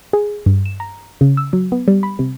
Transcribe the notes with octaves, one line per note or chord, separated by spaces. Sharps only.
G#4
G2
E7
A#5
C#3
E6
F#3
B3
G3
B5
C3